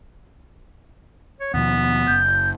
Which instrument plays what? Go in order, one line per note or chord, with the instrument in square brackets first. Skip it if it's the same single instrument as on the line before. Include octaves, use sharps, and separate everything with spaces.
[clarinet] C#5
[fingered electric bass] D#2 B2 F3 [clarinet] B3
[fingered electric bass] F#1 [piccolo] G6